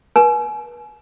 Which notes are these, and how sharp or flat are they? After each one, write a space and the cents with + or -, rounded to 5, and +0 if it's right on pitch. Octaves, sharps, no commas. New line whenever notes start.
B4 -40 G#5 +35